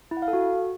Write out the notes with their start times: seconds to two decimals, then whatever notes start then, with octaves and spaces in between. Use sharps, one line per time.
0.11 E4
0.17 F#5
0.22 F5
0.28 A4
0.33 F#4